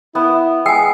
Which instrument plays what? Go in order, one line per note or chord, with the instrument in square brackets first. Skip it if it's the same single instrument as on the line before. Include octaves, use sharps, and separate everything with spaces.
[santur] B3 [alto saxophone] E4
[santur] G#3 [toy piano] G5 G#5 [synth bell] D#6 E6 C7